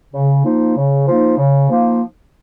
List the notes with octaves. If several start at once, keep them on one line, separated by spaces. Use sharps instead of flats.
C#3
F3 A#3 D#4
C#3
F3 A#3 D#4
C#3
F3 A#3 D#4